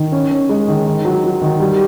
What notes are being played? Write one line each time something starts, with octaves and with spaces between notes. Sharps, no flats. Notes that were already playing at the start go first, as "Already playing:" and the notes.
Already playing: D#3
C#4
C#4
G#3
D#3
D#3
F#3
F#3
D#3
G3